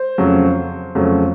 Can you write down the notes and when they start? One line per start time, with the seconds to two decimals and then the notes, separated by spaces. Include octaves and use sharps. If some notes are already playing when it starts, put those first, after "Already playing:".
Already playing: C5
0.18 F2 C#3 F#3 A3 C#4
0.95 F2 C#3 F#3 A3 C#4